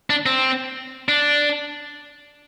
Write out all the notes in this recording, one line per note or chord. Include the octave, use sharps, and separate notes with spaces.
D4
C4
D4